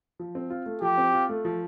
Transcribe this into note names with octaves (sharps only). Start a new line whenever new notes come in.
F3
C4
F4
A3
F3 G4
C4
F4
A3
F3